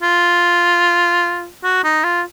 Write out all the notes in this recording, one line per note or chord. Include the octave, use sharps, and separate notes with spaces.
F4
F#4
D#4
F4